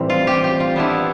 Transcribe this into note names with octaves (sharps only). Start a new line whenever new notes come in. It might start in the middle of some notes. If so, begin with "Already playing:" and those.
Already playing: A2 E3 G3 C4
F4
G4
G4
F4
E3 B3 D4 E4